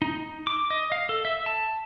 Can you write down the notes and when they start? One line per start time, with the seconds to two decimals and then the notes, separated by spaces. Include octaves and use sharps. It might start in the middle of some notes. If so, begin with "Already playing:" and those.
0.02 D#4
0.47 D6
0.70 D#5
0.92 F5
1.09 A4
1.25 E5
1.46 A5